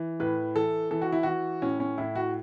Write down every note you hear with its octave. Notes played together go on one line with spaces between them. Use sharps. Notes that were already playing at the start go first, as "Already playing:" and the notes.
Already playing: E3
A2 B4
E3 A4
E3 A4
F#4
E4
E3 F#4
A2 C#4
C#4
A2 E4
F#4